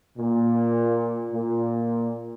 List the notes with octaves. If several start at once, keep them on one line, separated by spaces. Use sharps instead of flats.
A#2
A#2